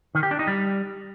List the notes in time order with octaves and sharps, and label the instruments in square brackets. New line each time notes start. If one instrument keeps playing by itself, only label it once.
[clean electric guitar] D#3
G4
D4
D#4
G3